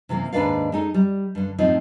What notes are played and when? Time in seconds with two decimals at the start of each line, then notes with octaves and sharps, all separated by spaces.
0.09 C3 E3 A3 A#3
0.33 D#2 G#2 D4 B4 D5 F5
0.72 G#3 D#4 A4
0.94 G3
1.35 G2 D3
1.58 A2 F3 C4 D#4